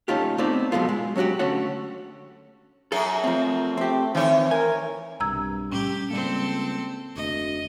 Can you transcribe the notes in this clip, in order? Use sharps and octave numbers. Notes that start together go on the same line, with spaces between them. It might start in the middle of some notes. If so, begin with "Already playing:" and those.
A3 C#4 D#4 F4 G4
A3 B3 C4 D#4 D5
B2 F#3 G#3 A3 B3 F4
G#3
F#3 C#4 D4 F#4 G4
D3 A3 C#4 F#4 C#5 F#5
F#2 F#3 G#4 A4
F3 A3 C4
C4 G4
D#3 E3 C4 C#5
A#4 G#5
B1 G2 C3 A#5 E6 G#6
A2 G3 C#4 G4
C#2 G3 A#3 C4 A4
F1 D2 D#5